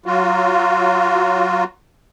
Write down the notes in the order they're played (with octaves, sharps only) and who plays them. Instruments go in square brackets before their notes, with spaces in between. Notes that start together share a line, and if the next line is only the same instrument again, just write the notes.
[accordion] F#3 F4 F#4